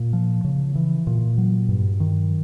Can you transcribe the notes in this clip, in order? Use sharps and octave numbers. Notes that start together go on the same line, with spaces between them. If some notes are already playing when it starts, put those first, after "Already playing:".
Already playing: A#2
F3
C#3
E3
A#2
F#3
G2
D#3